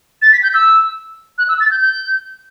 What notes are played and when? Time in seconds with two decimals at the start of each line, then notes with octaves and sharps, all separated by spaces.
0.22 A6
0.33 B6
0.43 G6
0.54 E6
1.38 F#6
1.49 E6
1.60 A6
1.71 G6
1.81 G6